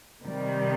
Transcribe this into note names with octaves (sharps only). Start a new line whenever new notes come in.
C3 D#3 G3